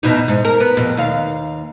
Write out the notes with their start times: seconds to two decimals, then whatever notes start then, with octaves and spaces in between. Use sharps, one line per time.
0.03 E2 B2 D#4
0.28 G#2
0.45 A#4
0.60 B3
0.77 F2 B2
0.97 D#2 F5